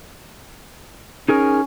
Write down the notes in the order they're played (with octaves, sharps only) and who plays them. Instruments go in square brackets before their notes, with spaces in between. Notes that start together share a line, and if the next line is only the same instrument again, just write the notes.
[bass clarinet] C#4 [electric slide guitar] D#4 G#4 A#4